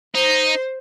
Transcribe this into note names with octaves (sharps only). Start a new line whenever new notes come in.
D#4 C5